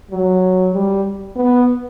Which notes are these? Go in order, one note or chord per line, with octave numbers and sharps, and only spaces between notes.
F#3
G3
B3